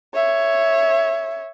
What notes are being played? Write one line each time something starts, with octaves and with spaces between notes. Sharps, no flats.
C#5 E5